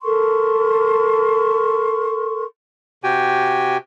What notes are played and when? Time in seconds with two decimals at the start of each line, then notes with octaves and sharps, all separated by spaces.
0.03 A4 A#4 C6 C#6
3.04 C3 F#4 G4 G5 G#5